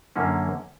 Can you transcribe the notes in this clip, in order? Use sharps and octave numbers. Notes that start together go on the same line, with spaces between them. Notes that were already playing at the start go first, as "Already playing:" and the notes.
F#2 D3 A#3 C#4